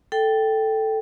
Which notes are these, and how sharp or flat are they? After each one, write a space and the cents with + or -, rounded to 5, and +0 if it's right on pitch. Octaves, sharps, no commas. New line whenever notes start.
A4 +0 G5 -5